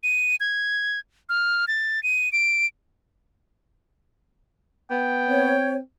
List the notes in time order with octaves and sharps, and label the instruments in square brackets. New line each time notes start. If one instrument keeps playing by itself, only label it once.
[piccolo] D#7
G#6
F6
A6
D#7
D7
[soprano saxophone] B3 [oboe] G5
[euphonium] C4 [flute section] C#5